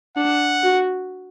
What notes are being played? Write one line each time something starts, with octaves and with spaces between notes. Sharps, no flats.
D4 F#5
F#4